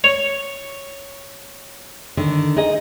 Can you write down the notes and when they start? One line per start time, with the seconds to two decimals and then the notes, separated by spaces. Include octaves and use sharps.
0.04 C#5
2.17 D3 D#3
2.56 D#4 G#4 D#5